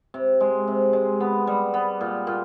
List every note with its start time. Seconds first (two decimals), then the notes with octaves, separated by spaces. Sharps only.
0.14 C3
0.41 G#3
0.68 C3
0.93 G#3
1.20 B3
1.47 G3
1.74 B3
2.01 A#2
2.27 A#2